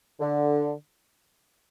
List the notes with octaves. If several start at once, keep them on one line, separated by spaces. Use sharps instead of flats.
D3